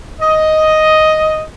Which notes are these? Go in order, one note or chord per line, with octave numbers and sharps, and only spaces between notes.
D#5